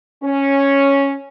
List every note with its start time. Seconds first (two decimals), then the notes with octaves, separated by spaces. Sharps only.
0.24 C#4